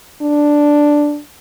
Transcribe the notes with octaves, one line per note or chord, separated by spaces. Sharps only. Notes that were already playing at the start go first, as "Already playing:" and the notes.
D4